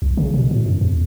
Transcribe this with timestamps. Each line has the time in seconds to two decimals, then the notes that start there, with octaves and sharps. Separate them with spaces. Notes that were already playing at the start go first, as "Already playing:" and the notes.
0.02 B1
0.17 C#3
0.34 B2
0.51 A2
0.66 F#2
0.81 E2